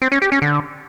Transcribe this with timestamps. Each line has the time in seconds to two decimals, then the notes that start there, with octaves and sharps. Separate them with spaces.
0.02 C4
0.12 C#4
0.22 G4
0.32 C#4
0.42 D3